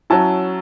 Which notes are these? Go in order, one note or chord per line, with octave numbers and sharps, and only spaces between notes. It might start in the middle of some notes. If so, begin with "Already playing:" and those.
F#3 C#4 E4 A5